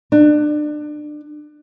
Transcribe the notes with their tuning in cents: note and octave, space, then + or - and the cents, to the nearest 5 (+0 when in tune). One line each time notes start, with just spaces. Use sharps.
D4 +30